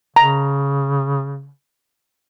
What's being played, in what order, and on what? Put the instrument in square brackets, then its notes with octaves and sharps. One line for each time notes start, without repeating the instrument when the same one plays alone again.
[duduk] C#3 [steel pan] A#5